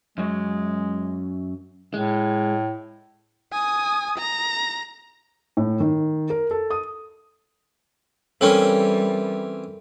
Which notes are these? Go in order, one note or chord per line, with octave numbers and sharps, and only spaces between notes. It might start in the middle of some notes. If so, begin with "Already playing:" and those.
F#2 F#3 G#3
A2 G#3
G#5 D#6
A#5
A2
D#3
A#4
A4
D#6
E3 G3 C4 C#4 A4 A#4